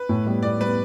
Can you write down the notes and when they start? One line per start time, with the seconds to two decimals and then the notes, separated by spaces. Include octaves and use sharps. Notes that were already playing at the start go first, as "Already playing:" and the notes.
Already playing: B4
0.09 A2
0.27 G3 B3
0.43 A2 D5
0.60 G3 B3 B4